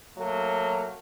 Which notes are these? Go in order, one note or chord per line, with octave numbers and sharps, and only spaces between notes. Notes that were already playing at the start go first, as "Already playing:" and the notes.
F#3 A3 A#3